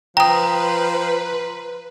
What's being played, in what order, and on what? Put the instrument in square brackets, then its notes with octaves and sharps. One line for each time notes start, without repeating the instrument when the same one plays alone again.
[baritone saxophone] F3 [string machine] B4 [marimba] G5 D#6 [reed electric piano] A#5